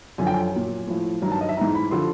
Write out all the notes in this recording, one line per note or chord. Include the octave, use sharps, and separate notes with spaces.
F#2 D3 F3 G#5
G5
G#5
A#2 F#3
A2 F3
G2 D#3 F#3 A#5
A5
D#5
E5
G#2 E3 A#5
B5
D3 F3 C6